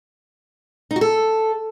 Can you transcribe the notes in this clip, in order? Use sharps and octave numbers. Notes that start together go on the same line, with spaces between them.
D#4
F#4
A4